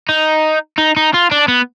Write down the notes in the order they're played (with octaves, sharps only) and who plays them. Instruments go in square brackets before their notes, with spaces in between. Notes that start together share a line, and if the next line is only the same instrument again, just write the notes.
[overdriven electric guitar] D#4
D#4
D#4
F4
D4
B3